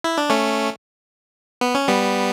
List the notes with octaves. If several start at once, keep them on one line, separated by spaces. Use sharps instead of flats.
E4
D4
A3 C#4
B3
C#4
G3 B3